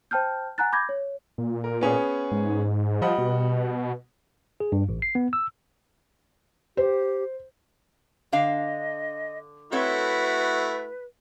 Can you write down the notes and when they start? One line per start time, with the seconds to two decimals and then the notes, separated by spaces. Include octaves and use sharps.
0.11 C5 G5 A5 F6 G6
0.58 F#5 G#5 A#5 F#6 A6
0.72 B5 D6 G6 G#6 A#6
0.89 C#5
1.38 A#2
1.64 A#4
1.81 B3 C#4 G#4
2.31 G#2
3.02 F3 G3 D#5 F#5
3.18 B2
4.60 G#4
4.72 G2
4.89 A1
5.02 C7
5.15 B3
5.33 E6
6.77 G4 C5
8.32 D3 D4 D#5 F5
9.72 A3 C4 E4 F#4 A4 B4 C#5